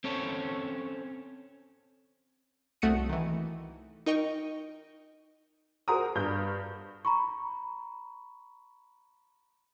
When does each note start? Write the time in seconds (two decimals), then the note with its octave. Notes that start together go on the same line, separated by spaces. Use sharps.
0.04 C4 C#4 A4 C#5
2.82 C2 A3 F#4 D#6 C#7 D#7
3.09 D#3 E3
4.06 D#4 A#4 D#5 G5 C#6
5.88 F#4 G#4 A#4 C5 A#5 D#6
6.15 G2 G6
7.05 A#5 B5 C#6